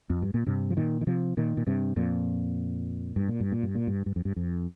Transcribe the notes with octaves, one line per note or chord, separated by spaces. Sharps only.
F2
G2
A#2
G2 C3
F3
A#2 D#3
D#3
C3 F3
A#2 D#3
A#2
G2 C3
F2 A#2
G2
A#2
G2
A#2
G2
A#2
G2
G2
F2
G2
F2